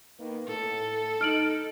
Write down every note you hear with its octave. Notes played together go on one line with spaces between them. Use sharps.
D#3 A#3 B3
A2 A4
D#4 F6 D7 F#7